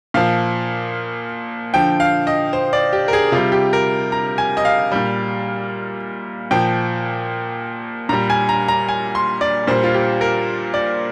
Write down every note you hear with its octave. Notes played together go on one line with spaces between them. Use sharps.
A#2 F3 F5
D3 F3 G5
F5
D#5
C5
D5
G4
A#4
G#4
C3 G3 F4
G4
A#4
A#5
G#5
D#5
F5
A#2 G3
A#2 F3 G5
A#2 G3 A#5
G#5
A#5
A#5
G#5
C6
D5
A#2 G3 C5
F4
G4
A#4
D5